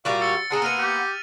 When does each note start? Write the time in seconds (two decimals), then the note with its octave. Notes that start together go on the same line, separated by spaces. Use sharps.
0.05 A#2 G3 F#4 F5 D6
0.21 E6 A6 C#7
0.51 D4 G#4 A#4 F#5 C6
0.62 A#3 B3 F6 D#7 F7
0.79 G4